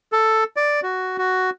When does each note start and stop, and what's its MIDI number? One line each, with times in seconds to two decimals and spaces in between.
0.12 0.44 69
0.56 0.80 74
0.83 1.17 66
1.18 1.50 66